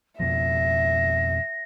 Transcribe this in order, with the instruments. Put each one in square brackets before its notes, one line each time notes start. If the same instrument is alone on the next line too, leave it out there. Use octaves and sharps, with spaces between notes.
[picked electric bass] F2 B2 F3 [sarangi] E5 [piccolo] A#6